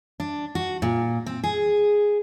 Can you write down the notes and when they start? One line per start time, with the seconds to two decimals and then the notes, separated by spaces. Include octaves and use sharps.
0.20 D4
0.55 F#4
0.82 A#2
1.26 C4
1.44 G#4